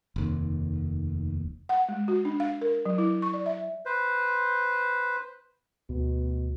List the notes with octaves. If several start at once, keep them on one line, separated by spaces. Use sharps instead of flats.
F1 D#2
F#5
G#3
F#4
D4
F5
A#4
F#3
E4
C#6
D5
E5
B4 C5
D2 B2